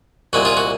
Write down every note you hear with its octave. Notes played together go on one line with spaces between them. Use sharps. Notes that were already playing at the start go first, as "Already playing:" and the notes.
C2 A#2 G#3 C4 F#4
F4 G#4
F#4